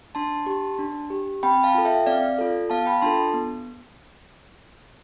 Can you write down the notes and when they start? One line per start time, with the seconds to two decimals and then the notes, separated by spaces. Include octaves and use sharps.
0.15 D4 A5 C6
0.46 G4
0.79 D4
1.10 G4
1.43 C4 G5 B5
1.54 G5
1.63 F5 A5
1.75 F4 A4
1.85 E5 G5
2.06 C4 D5 F5
2.38 F4 A4
2.70 B3 F5 A5
2.86 G5 B5
3.02 D4 F4 A4 A5 C6
3.33 B3